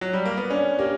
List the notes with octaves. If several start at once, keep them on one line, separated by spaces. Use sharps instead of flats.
F#3
G3
A#3
B3
C#4 D4
A#3 G4